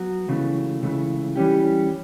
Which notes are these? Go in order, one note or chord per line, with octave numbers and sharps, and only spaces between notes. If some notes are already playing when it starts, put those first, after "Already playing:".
Already playing: F#3 B3 F#4
C#2 C#3 E3 A3
C#2 C#3 E3 A3
E3 G3 C#4 G4